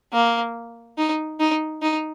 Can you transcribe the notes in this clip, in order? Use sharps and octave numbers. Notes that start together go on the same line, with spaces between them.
A#3
D#4
D#4
D#4